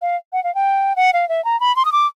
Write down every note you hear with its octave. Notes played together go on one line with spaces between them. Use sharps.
F5
F#5
F5
G5
F#5
F5
E5
A#5
B5
C6
D#6
D6